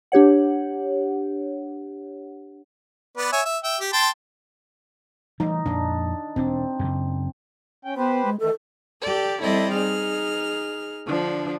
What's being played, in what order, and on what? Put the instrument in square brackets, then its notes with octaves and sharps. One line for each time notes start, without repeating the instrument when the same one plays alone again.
[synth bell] D4 G4 C#5 F#5
[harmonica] B3 B4 D5
C#5 E5 G#5
E5
E5 G5
G4
G5 A5 C6
[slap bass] E3 G3 A3 [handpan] D#4
[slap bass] F2 A#2 [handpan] D4
[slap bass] E1 D4 [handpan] C4
[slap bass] F#2 C#3
[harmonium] C#4 G5
[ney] B3 [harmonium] G4 B4 C5
[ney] G#3
[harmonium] D#3 E3 A3 [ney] A4
[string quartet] G4 A4 D5
G3 C4 E4 A4 D5 D#5
D#4 G#4 F6
D3 F3 D4